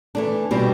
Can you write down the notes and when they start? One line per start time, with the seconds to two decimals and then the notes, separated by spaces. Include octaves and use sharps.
0.15 E3 A3 D4
0.51 B2 G3 C4 E4 G4